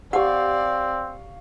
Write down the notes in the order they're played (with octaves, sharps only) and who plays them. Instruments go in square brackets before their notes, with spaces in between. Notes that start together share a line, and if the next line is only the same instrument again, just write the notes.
[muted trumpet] C4 [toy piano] G4 F#5 [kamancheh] D5 [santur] F5 C#6